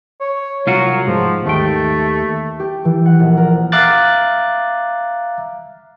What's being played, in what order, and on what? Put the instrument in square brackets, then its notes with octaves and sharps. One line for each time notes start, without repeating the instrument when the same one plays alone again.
[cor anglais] C#5
[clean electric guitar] C2 F4 F#4 [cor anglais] F#3
[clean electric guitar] G#2 [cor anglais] F3
[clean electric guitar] D#2 G5 [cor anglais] A3
[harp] G4
E3
F#5
A#1
A#4
[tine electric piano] E5 F5 A#5 D6 F#6 A6